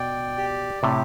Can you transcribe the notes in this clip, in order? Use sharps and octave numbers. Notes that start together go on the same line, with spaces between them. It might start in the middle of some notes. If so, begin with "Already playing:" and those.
Already playing: B2 D5 G5
G4
A2 C3 G4